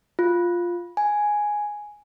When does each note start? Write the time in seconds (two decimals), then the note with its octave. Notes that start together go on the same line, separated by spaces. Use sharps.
0.19 F4
0.97 G#5